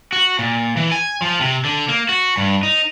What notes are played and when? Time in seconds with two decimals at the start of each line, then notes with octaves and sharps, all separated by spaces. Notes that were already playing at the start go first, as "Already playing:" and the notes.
0.12 F#4
0.39 A#2
0.77 E3
0.92 G#5
1.22 F3
1.41 C3
1.65 D3
1.88 A#3
2.09 F#4
2.37 G2
2.63 D#4